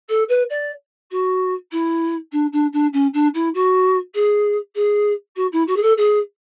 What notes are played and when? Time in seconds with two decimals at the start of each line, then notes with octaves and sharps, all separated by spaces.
0.09 A4
0.28 B4
0.49 D5
1.11 F#4
1.71 E4
2.32 D4
2.52 D4
2.72 D4
2.93 C#4
3.13 D4
3.34 E4
3.54 F#4
4.14 G#4
4.75 G#4
5.36 F#4
5.52 E4
5.67 F#4
5.76 G#4
5.82 A4
5.97 G#4